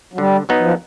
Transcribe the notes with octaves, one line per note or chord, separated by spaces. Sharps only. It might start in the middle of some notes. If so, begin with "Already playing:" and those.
F#3
D3 G3
F#3 B3 D#4
F3